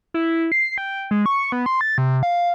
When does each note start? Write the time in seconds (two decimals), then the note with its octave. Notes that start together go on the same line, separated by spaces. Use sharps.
0.14 E4
0.52 C7
0.78 G5
1.11 G#3
1.26 C#6
1.52 B3
1.66 C6
1.81 A6
1.98 C3
2.23 F5